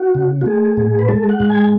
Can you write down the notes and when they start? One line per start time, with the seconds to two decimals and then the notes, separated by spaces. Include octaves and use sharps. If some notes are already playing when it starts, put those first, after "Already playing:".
Already playing: F#4
0.15 C#3
0.41 F#4
0.46 A3 G#4
0.77 A2
0.99 B4
1.09 G#3 A4
1.29 F#5
1.40 G#2
1.50 G#5